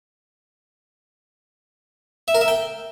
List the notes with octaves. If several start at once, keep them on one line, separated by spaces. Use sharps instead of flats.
E5
A#4
E5
G5